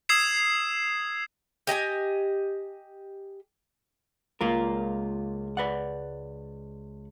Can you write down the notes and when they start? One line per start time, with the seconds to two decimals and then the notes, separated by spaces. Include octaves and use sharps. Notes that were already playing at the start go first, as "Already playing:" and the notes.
0.09 D#6 E6 G#6 C7 E7
1.67 G4 D#5 G5 G#5
4.41 C#2 A#3 F4 A#4
5.57 B4 D5 F#5